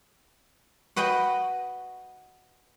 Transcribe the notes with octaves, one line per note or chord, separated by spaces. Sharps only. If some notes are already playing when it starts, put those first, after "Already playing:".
F#4 B4 D#5 G5 B5